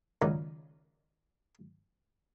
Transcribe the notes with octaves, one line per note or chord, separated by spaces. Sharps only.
C#2 D#3 F#3 D#4 D5 D#5